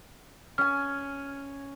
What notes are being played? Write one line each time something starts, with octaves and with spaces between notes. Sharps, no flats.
C#4 G#5 F6